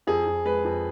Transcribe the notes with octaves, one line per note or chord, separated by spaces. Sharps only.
F2 G#4
F2
G#3 B4
F2